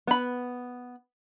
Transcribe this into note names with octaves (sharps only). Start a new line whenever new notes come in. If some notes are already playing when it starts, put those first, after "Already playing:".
B3 B5